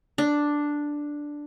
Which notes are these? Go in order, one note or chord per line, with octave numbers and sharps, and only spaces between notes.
D4